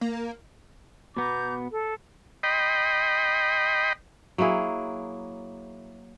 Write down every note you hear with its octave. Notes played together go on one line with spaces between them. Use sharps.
A#3
B2 B3 A#5 D6 G6
A4
D#5 G5 B5 C6
F#3 A#3 E4 G#4